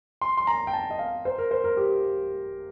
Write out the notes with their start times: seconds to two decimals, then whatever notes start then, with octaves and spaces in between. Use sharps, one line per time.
0.21 C6
0.37 C6
0.47 A#5
0.67 G5
0.73 A5
0.91 D#5
0.99 F5
1.25 C5
1.38 A#4
1.51 C5
1.64 A#4
1.77 G4